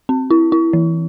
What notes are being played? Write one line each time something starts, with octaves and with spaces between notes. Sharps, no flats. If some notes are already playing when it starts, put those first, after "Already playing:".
C4
E4
E4
E3